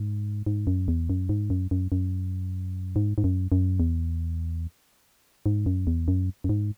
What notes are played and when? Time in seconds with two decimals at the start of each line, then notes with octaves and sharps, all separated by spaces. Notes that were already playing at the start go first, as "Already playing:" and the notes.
Already playing: G#2
0.46 G#2
0.67 F#2
0.88 E2
1.10 F#2
1.29 G#2
1.50 F#2
1.71 F#2
1.92 F#2
2.96 G#2
3.18 G#2
3.24 F#2
3.52 F#2
3.80 E2
5.46 G#2
5.66 F#2
5.87 E2
6.08 F#2
6.44 F#2
6.49 G#2